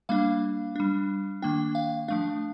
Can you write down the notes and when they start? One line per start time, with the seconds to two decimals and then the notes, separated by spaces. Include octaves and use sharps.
0.09 G3 A#3 D4 F5
0.76 G3 D4
1.42 D#3 A#3 D4 G5
1.75 F5
2.08 F3 A3 D4 F5